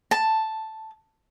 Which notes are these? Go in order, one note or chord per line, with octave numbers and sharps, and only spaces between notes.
A5